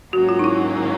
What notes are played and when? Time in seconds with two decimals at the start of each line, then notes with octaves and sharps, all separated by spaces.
0.12 G#2 D#3 F#3 A#3 C#4 F#4
0.29 F4
0.39 D#4
0.44 E4